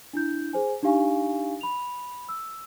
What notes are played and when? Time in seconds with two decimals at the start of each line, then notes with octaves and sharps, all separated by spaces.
0.13 D4 E4 G6
0.53 G#4 C5 G#5
0.83 D4 D#4 G4 F5 G#5 C#6
1.61 B5 F7
2.29 E6